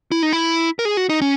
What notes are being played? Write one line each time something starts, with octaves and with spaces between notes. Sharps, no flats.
E4
D#4
E4
A#4
G#4
F#4
D#4
C#4